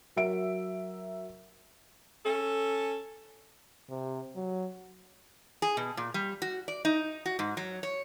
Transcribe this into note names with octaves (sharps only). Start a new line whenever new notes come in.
F#3 A#4 E5 D7
C#4 A4
C3
F#3
G#4
B2
A#2
G3
F#4
D5
D#4
F#4
G#2
F#3
C#5